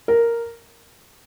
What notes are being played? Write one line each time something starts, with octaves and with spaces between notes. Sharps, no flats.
A#4